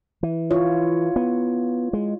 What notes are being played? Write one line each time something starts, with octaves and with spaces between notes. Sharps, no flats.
E3
E4 F4 C#5
B3
G#3